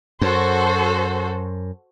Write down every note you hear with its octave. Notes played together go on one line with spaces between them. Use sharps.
F#2 F#4 A4 C5